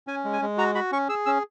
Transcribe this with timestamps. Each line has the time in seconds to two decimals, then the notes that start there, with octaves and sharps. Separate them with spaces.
0.07 C#4 G#5
0.25 G#3
0.33 G#5
0.42 G#3
0.58 F#4 A#5
0.75 F#4 B5
0.92 C#4 C#6
1.09 G#4 E6
1.26 C#4 E6